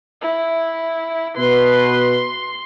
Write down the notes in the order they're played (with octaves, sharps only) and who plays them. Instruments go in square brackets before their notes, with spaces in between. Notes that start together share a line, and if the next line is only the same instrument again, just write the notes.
[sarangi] E4
[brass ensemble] B2 B4 [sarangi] C6